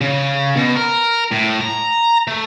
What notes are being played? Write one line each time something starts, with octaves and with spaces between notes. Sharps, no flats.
C#3
B2
A#4
A2
A#5
A3